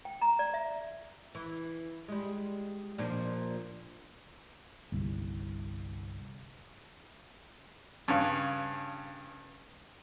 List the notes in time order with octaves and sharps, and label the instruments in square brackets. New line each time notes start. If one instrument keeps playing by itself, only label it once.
[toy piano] G5
A#5
D5
E5
[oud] E3
G3 G#3
A#2 F3 D4
[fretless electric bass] G1 C2
[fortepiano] G2 C#3 F5